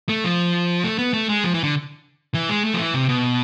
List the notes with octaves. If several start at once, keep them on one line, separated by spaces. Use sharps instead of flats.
A3
F3
A3
B3
A3
G#3
F3
E3
D3
E3
G#3
A3
F3
E3
C3
B2